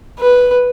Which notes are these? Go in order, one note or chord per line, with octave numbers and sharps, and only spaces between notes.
B4